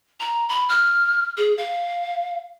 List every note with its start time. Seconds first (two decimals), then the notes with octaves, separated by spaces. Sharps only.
0.20 A#5
0.49 B5
0.69 F6
1.37 G#4
1.58 F5